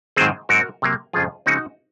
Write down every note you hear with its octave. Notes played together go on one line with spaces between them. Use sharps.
G#2 D#3 F#3 C4 G#4 C5
G#2 F#3 C4 F#4 A#4
C3 F#3 A#3
F2 C#3 F3 F4 G#4
C#3 F3 G#3 C4 D#4 F#4